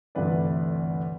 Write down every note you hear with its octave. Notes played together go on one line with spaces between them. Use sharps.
G1 D2 C3 E3 B4 D5